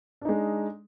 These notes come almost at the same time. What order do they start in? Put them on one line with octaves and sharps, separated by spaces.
D4 D#4 G#3